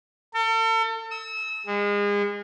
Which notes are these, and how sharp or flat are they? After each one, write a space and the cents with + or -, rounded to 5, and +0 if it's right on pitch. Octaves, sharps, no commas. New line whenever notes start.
A4 +40
E6 -30
G#3 -30